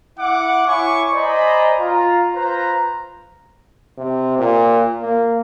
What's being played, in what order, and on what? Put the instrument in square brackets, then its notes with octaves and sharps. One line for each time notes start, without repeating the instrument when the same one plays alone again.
[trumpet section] E4 F#5 D6
E4 C#5 G#5 C#6 D6
C5 D5 D#5 G#5 A#5 B5
F4 A#5
F4 B4 C5 A#5
[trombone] C3
A#2
A#3